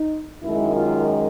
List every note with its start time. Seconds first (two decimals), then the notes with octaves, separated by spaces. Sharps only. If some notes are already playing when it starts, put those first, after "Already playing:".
Already playing: D#4
0.43 F#2 D#3 G#3 E4
0.76 F4